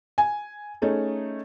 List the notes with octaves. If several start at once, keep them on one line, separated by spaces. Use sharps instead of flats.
G#5
A3 C#4 D#4 G#4